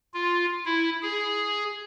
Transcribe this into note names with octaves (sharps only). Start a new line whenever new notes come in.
F4
E4
G#4